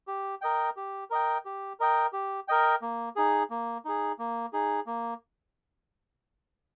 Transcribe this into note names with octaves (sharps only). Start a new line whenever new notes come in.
G4
A#4 D#5 G5
G4
A#4 D#5 G5
G4
A#4 D#5 G5
G4
A#4 D#5 G5
A#3
D#4 G#4
A#3
D#4 G#4
A#3
D#4 G#4
A#3